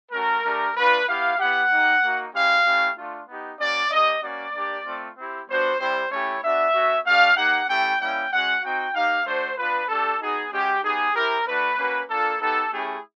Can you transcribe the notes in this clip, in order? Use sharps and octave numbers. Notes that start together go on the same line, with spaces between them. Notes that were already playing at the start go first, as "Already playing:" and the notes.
A3 C#4 F#4 A#4
A3 D4 G4
A3 D4 F4 B4
B3 E4 G4 F5
B3 E4 G4 F#5
A#3 D#4 G4
A#3 D#4 F#4
G#3 C#4 E4 G4 F5
A3 C#4 E4 G4
A3 D4 F4
B3 D#4 G4
A#3 C#4 F#4 D5
A#3 D4 G4 D#5
A#3 C#4 F#4 D5
A#3 D4 G4
A3 C4 F4
C4 E4 G4
G3 B3 D4 F#4 C5
G3 C4 E4 G4 C5
A3 C#4 E4 G4 C#5
B3 D4 F#4 E5
A3 C#4 F#4
A3 D4 G4 F5
A#3 D#4 G4 F#5
A3 C#4 E4 G4 G5
G3 A#3 C#4 E4 G5
G#3 C#4 F#4 F#5
C4 D#4 F#4 G5
A#3 D#4 G4 F5
A3 D4 F#4 C5
B3 D4 F4 B4
A3 D4 G4 A4
B3 D#4 F#4 G#4
G#3 C#4 F#4 G4
B3 D#4 G4 G#4
C4 E4 G4 A#4
A3 D4 F#4 B4
A#3 C#4 F#4
A#3 D4 F4 A4
B3 D#4 G4 A4
A3 C#4 E4 G4 G#4